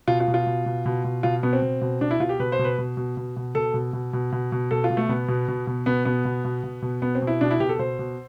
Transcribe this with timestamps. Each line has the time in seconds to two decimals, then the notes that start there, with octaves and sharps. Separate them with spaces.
0.08 B2 F4
0.20 F4
0.28 B2
0.34 F4
0.46 B2
0.66 B2
0.86 B2
1.04 B2
1.23 B2 F4
1.43 B2 B3
1.53 C4
1.62 B2
1.81 B2
2.01 B2 D4
2.11 E4
2.20 B2 F4
2.29 G4
2.40 B2 B4
2.52 C5
2.59 B2
2.65 B4
2.78 B2
2.97 B2
3.17 B2
3.36 B2
3.55 B2 A4
3.74 B2
3.93 B2
4.13 B2
4.32 B2
4.52 B2
4.71 B2 A4
4.84 F4
4.90 B2
4.97 A3
5.09 B2 B3
5.28 B2
5.48 B2
5.67 B2
5.86 B2 B3
6.05 B2 B3
6.25 B2
6.45 B2
6.64 B2
6.82 B2
7.02 B2 B3
7.15 C4
7.22 B2
7.27 E4
7.41 B2 D4
7.51 E4
7.60 B2 G4
7.69 A4
7.79 B2 C5
7.99 B2